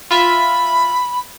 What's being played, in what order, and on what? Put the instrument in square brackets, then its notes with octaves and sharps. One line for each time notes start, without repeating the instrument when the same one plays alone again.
[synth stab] F4 E5 [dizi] B5